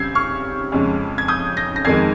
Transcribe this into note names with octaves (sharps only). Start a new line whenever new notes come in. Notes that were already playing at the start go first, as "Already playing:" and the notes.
Already playing: C#3 G3 C4 G6 G#6 C7
C#6 F6
F2 C#3 G#3
G#6
D#6 G6
G6 A#6
A#6
F2 D#3 G#3 G#6 C7